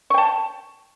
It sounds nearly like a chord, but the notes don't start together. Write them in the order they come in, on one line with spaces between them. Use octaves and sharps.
C#6 G5 A5